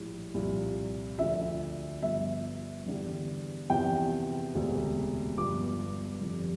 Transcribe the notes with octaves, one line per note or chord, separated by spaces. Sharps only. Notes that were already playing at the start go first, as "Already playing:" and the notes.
Already playing: A#1 A2 G3
C2 A#2 F3
D2 D3 F3 E5
G1 G2 F3 E5
E2 D3 G3
E2 C3 F3 G5
E1 D2 C3
G1 G2 F3 D6
F1 F2 C3